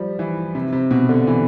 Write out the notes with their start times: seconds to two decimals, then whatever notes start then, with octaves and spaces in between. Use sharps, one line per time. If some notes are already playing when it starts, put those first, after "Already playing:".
Already playing: F3 G3
0.19 E3
0.55 C3
0.72 C3
0.91 B2
1.09 D3
1.27 E3